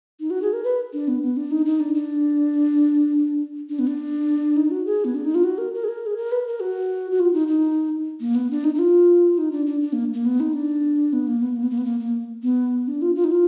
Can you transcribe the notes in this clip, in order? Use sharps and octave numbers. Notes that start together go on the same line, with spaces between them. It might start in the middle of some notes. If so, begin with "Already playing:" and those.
D#4
F#4
G#4
A#4
B4
D4
B3
B3
D4
D#4
D#4
D4
D4
D4
B3
D4
D#4
F#4
G#4
B3
D4
D#4
F4
F#4
A#4
A#4
G#4
A#4
G#4
A#4
B4
A#4
F#4
F#4
F4
D#4
D#4
A#3
B3
D4
D#4
D#4
F4
D#4
D4
D4
D4
A#3
A#3
B3
D#4
D4
B3
A#3
B3
A#3
B3
A#3
B3
A#3
A#3
B3
D4
F4
F4
D#4
F4